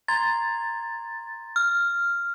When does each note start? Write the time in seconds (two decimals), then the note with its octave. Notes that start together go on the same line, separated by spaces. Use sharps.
0.08 A#5 C6 G#6 A6
1.56 F6